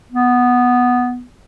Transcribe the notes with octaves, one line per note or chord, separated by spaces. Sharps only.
B3